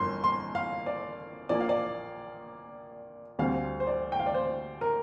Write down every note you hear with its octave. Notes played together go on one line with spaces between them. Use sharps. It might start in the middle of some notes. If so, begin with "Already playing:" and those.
Already playing: G1 F2 A#3 C6
C6
F5
D5
A#1 A#2 A#3 D5
F5
D5
D2 D3 G3 C4 F5
C5
D5
G5
F5
D5
C5
A#4